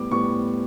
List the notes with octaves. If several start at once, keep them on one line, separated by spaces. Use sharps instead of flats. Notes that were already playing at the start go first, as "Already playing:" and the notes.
Already playing: A2 G3 B3 D6
A2 G3 B3 C#6